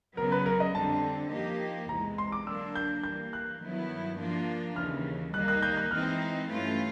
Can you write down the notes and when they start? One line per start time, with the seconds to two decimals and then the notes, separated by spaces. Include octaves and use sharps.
0.17 C#3 F#3 B3 A#4
0.32 B4
0.46 A#4
0.60 D#5
0.75 F2 D3 G3 C4 A5
1.32 F3 A#3 D#4 G4
1.89 E2 C3 E3 G#3 A#5
2.18 C6
2.32 D6
2.46 D3 F#3 A#3 D4 E6
2.75 G6
3.03 E3 G3 A#3 G6
3.33 F#6
3.61 G2 D#3 F#3 B3 E4
4.18 F3 A#3 D4 F4
4.76 D#2 C#3 E3 F6
5.33 D#3 G3 A#3 D#4 F#6
5.48 F#6
5.63 G6
5.77 F#6
5.91 E3 G#3 C4 D#4 F6
6.49 G2 E3 A3 C#4 F4